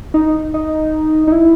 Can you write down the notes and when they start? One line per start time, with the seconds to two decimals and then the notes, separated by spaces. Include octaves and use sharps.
0.14 D#4
0.54 D#4
1.27 D#4
1.32 E4